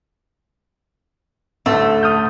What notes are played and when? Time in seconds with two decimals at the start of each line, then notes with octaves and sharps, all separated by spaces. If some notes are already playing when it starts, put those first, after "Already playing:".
1.66 A1 D2 A3
2.03 D#6 F6 G6